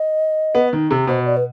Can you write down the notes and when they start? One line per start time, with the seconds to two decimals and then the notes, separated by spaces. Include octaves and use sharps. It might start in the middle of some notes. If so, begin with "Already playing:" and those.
Already playing: D#5
0.55 B3
0.73 D#3
0.91 C3
1.07 B2 C5
1.25 D5
1.36 B4